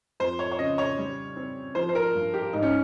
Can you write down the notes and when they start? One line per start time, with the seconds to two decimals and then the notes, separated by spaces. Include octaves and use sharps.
0.20 F2 C5
0.39 C#5
0.52 C#5
0.59 C#3 D#5
0.78 C#5
0.98 G3
1.36 C4
1.75 F3 C5
1.89 C5
1.95 A#4
2.15 G2
2.34 G4
2.53 G#2 D#4
2.62 C#4